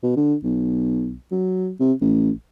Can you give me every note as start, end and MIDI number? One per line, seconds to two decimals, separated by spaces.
0.03 0.13 47
0.16 0.34 50
0.43 1.15 35
1.31 1.71 54
1.80 1.93 48
2.01 2.30 33